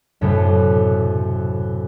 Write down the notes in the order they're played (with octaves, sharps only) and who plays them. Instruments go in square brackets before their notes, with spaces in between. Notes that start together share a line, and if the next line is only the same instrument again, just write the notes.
[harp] B1 F#2 A2 C3 A4 C#7